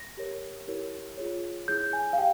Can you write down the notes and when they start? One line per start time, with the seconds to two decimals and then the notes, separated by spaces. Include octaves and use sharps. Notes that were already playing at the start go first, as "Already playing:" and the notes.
Already playing: A#6
0.17 G4 A#4 C#5
0.68 E4 G4 A#4 C#5
1.18 F4 G#4 C#5
1.68 E4 G#4 C#5 G6
1.93 G#5
2.13 F5
2.18 G4 G5